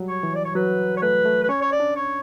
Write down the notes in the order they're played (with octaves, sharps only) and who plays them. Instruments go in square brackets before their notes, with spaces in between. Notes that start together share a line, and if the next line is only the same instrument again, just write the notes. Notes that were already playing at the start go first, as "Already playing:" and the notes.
Already playing: [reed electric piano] F#3 G3
[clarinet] C#5
[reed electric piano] E3
[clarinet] D5
C#5
[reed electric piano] F#3 [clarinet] B4
[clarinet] C#5
[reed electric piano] A3 [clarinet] B4
[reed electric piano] A3
[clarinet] B4
[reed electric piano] C#4 [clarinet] C#5
[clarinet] C#5
D5
[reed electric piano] D4
[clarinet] C#5